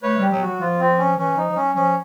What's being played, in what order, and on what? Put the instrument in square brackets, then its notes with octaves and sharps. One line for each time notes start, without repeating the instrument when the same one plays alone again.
[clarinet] A3 [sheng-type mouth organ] B4 C#5
[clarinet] G3 [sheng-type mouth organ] G4
[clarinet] F#3
[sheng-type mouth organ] F#4
[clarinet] F#3
[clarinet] F3 [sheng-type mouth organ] F4
[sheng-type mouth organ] C4
C#4
[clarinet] E3 [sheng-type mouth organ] C#4
[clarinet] F3 [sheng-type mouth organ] D#4
[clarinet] F3
[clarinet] F#3 [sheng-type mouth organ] C#4
[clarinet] F3 [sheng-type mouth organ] C#4